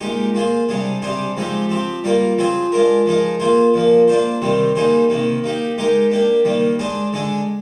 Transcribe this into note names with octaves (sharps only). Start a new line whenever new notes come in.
A#2 G#3 D#4 G4
A#3 F4 G#4 C5
C3 G3 D4 G#4
C3 G3 D4 G#4 C5
F3 G#3 C4 D#4 G4
F3 C4 G4
G3 A#3 F4 A#4
F3 C4 F4 G#4 C5
G#3 D4 F4 A#4
F3 G#3 D#4 A#4
A#3 F4 G#4 C5
A#2 F3 A#3
A#3 D4 F4 C5
C3 D#3 G3 C4
G3 A#3 D#4 G#4 C5
C3 D#3 A#3
A#3 D#4 G4
G#3 D#4 G4 A#4
A#3 D4 G4
D#3 G3 A#3
G#3 D4 G#4 C5
D3 G#3 D4 G#4